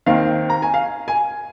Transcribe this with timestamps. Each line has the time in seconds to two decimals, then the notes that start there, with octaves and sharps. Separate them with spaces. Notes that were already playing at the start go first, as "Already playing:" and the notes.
0.06 D#2 D#3 C4 F5
0.50 A#5
0.62 G#5
0.74 F5
1.08 G#5